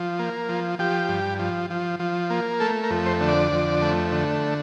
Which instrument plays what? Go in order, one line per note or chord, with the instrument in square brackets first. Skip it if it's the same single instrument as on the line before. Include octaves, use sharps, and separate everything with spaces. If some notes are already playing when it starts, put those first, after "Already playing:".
Already playing: [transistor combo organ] F3
A#3
F3
F3 G4
G2
F3
F3
F3
A#3
A3 A4
A#4
F2
C5
D3
D5
F2
A3
D3